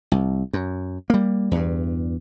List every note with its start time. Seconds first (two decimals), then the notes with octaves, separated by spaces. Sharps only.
0.12 C2
0.53 F#2
1.10 G3 A#3
1.51 E2 G2